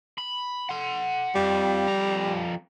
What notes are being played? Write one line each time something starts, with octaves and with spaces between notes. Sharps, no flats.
B5
F#5 C6
F2 G3
F2 A#5